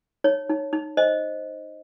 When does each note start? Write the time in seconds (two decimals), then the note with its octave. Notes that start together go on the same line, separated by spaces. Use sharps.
0.24 D#4 C#5
0.49 D#4
0.73 D#4
0.97 C5 D#5